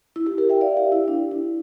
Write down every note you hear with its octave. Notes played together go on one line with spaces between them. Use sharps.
E4
E4 G4
G4 A#4
E5 G5
D5 F5
E4 G4
E4
D4
E4